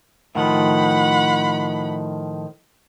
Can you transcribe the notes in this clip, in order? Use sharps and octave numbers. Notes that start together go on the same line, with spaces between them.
A2 D#3 F3 F#5 B5